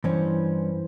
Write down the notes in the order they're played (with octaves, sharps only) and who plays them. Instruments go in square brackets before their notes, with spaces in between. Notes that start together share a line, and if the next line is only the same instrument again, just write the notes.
[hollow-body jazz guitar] G2 C#4 [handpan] E3 C5